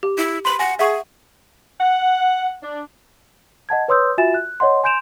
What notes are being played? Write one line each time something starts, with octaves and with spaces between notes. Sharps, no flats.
G4
E4
B5 C6 F#7
F#5 G#5 A#6
G#4 E5 F#5 C#6
F#5
D4
D#5 F#5 A5 G#6
B4 C#5 C6 D#6 E6 G6
F4 F#4 E5 G#5 A6 E7
F#6
C#5 D#5 F#5 C6
G#5 C6 G6 D7 E7 F7